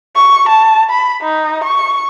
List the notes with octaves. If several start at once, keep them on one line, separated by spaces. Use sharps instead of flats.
C#6
A5
B5
D#4
C#6